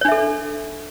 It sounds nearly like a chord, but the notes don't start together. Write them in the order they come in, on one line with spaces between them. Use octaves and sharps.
C#5 D4 E5 A4